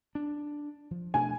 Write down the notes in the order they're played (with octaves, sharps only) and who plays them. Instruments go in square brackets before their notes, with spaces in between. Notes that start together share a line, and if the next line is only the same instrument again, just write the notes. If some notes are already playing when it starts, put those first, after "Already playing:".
[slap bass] D4
F3
[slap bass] B2 A3 D4 [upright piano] G#5